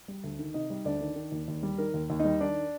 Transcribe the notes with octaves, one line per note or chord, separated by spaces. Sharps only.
G3
D2
D#3
C3 D#4 D#5
G3
D2 D4 D5
D#3
D#3
D#2
D#2
G3
D#3 A#4
D#2
D#2
D#4 D#5
G3
D#3 D4 D5